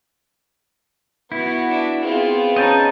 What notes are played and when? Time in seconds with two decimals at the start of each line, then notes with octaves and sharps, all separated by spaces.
1.32 B3 E4 F#4
1.69 D4 E5
2.02 B3 C4 F4 G#4 B4 F5
2.56 C#4 D#4 D#5 G5 A5